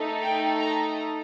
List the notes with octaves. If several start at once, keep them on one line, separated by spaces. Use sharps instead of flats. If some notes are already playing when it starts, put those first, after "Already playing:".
Already playing: A3 D#4 A4
G5
A#5